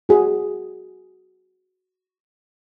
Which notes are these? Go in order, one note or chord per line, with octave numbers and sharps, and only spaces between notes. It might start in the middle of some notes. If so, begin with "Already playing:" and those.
F#4 G#4